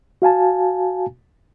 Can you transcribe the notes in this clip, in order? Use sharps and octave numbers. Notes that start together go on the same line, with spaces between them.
F#4 F5 G#5 A5